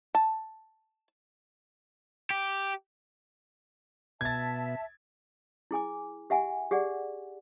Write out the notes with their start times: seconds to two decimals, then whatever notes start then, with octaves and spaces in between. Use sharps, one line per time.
0.15 A5
2.30 G4
4.21 B2 E5 A5 G#6 A6
5.71 E4 G#4 G#5 D6
6.30 G4 E5 F#5 G#5
6.71 G4 G#4 D5 F#5